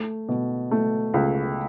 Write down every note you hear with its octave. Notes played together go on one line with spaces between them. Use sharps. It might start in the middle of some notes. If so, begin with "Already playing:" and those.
Already playing: A3
B2
A3
C#2